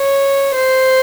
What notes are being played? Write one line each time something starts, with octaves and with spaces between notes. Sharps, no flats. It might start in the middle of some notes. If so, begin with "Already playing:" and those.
Already playing: C#5
C5